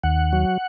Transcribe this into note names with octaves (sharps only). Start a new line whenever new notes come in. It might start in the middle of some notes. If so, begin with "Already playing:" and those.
D#2 F#5
F#3